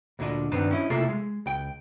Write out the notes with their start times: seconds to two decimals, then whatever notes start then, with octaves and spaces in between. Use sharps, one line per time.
0.19 D2 A#2 D3 D4 D#5
0.52 G2 D#3 B3 C4 D4 D#4
0.71 C#4 E4 D#5
0.90 C3 A3 A#3 E4 F4 A4
1.09 G#3
1.46 C#2 G5